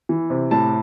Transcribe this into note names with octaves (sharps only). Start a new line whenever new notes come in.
E3
C3
A2 A5